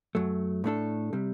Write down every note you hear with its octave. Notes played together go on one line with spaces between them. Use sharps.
F#2 F#3 A3
A2 A3 D4 A4
C3 G3